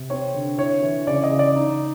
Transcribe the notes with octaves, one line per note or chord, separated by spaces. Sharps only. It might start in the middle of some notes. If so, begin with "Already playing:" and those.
Already playing: C3
C4 C#5
D3
E4 C#5
E3
C#3 D5
D#5
C#3
D5
D#4